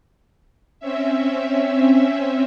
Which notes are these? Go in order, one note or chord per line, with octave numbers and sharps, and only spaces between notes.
C4 C#4 E5